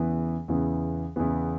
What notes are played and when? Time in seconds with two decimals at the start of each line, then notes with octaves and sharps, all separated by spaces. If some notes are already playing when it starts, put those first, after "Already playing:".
Already playing: E2 C#3 E3 B3
0.48 E2 C#3 E3 B3
1.16 E2 C#3 E3 B3